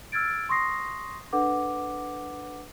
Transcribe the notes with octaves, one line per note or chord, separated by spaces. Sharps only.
E6 F6 G#6 A6 D7
C6 C#6 D#6 A#6 C7
D4 A4 B4 F#5 D6